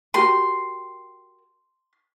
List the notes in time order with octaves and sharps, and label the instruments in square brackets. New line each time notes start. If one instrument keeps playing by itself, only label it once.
[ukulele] F#4 G4 A#4 [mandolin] C6